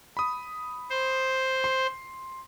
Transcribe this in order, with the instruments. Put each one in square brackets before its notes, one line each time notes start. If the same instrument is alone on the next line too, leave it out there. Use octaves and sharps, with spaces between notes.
[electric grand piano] B5 D#6
[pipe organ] C5
[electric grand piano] C6